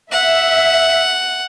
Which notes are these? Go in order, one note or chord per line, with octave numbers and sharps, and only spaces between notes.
E5 F#5